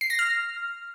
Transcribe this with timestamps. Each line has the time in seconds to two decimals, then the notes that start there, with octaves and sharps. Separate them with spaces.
0.01 C7
0.10 A#6
0.19 F6